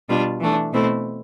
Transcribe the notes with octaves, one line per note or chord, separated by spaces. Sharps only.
B2 G3 D4 F4
E3 A3 D4
B2 A3 C4 E4